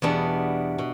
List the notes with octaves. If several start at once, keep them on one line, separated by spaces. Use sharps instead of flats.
E2 B2 G3 B3 D4
B2